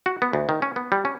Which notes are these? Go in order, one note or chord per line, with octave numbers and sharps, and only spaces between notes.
F#4
B3
D2
D#3
C#4
B3
G3
C#4